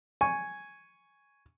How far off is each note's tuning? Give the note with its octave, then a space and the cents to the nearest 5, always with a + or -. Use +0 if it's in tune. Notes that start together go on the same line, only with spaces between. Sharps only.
G#5 +0 C#6 +0